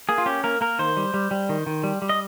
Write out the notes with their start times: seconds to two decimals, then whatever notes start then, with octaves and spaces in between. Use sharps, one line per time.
0.09 A#3 G#4
0.18 F4
0.26 C#4 G4
0.44 A#3 A#4
0.61 A#3 A#4
0.79 D#3 C5
0.97 G3
1.14 G3
1.31 G3
1.49 D#3
1.67 D#3
1.84 G3
2.02 G3
2.09 D#5